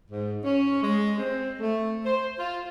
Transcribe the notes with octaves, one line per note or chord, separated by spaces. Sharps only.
G#2
C#4
G#3
C4
A3
C5
F4